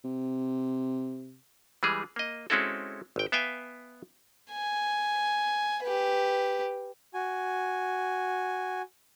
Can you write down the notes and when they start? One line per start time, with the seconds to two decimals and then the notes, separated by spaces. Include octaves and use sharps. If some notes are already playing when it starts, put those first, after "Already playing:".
0.04 C3
1.83 E3 G3 G#3 G#4
2.16 A#3 D#5
2.50 G#3 C4 C#4 E4 F#4 A4
3.16 G#1 G5
3.32 B3 E5 F5 G5 G#5
4.52 G#5
5.84 G4 B4
7.14 F#4 G#5